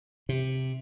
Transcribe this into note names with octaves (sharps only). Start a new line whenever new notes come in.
C3